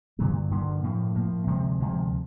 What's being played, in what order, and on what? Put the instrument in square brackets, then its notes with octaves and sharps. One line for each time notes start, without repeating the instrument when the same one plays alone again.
[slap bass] G2 D3 F#3 A#3
G2 D3 F#3 A#3
A2 F3 A#3
A2 F3 A#3
D2 C3 F3 G#3
D2 C3 F3 G#3